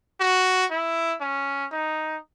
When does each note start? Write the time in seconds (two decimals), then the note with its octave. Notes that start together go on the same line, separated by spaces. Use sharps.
0.20 F#4
0.71 E4
1.21 C#4
1.72 D#4